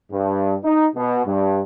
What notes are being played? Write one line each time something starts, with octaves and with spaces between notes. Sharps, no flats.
G2
D#4
B2
G2